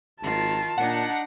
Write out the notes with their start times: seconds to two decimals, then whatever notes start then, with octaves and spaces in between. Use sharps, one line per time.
0.23 G#1 D#3 F4 A5
0.78 A#2 D4 D#4 F#5